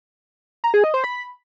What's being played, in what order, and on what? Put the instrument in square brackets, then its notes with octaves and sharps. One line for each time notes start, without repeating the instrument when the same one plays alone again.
[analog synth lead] A#5
G#4
D#5
C5
B5